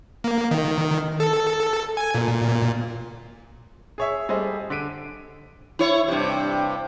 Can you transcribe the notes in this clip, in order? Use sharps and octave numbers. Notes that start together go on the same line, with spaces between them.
A#3
D#3
A4
G#5
A#2
A#2
G#4 C#5 E5
G3 G#4 A4 C5 D#5
D3 B6 D7 D#7
E4 C#5
G2 C3